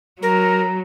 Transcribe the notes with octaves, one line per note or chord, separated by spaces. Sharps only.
F#3 A#4 A#5